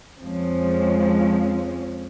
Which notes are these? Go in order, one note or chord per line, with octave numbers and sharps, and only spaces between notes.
F2 F3 G#3 C4 C#4